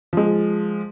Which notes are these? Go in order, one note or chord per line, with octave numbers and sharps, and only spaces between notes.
F3 G#3